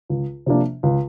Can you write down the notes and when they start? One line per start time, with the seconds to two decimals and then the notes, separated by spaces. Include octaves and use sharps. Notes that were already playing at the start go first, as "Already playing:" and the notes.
0.10 C#2
0.46 C3 F3 A#3 D4
0.83 C#2